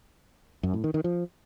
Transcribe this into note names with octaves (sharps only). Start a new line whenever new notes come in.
F#2
A2
D#3
D#3
F3